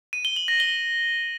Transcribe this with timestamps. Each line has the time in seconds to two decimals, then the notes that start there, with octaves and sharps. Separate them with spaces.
0.13 D#7
0.25 G7
0.36 F#7
0.48 A#6
0.60 G7